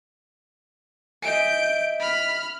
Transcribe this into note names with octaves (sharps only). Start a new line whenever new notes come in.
D#5 E5 G#5 G6 D7
B5 F6